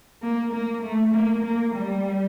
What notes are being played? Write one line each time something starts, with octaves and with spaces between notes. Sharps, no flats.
A#3
A#3
A3
A#3
A#3
G3